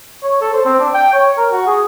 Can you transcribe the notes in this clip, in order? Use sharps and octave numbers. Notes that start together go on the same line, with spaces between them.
C#5
A4
C5
C4
D4
G5
C#5
A#4
F#4
G#4